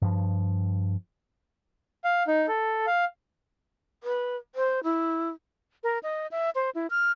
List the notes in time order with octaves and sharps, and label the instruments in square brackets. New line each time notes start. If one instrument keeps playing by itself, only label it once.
[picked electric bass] G2 F3
[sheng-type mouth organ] F5
D#4
A4
F5
[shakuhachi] B4
C5
E4
[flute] A#4
D#5
E5
C5
E4
F6